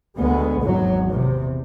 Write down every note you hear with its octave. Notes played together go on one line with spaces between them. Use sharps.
D2 G#3 B3
G#1 E2 F#3
E2 C3